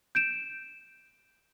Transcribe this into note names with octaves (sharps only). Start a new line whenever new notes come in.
G6 D7 E7